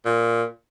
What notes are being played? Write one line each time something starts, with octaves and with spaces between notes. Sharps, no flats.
A#2